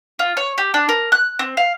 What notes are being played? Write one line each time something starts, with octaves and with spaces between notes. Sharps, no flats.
F4
C#5
G4
D4
A#4
F#6
C4
F5